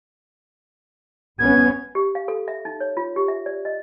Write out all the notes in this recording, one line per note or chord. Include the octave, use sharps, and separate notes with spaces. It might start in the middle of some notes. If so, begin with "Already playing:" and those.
G1 B3 C#4 G#6
G4
F5
A4
E5
D#4
C#5
F4
G4
E5
D5
D#5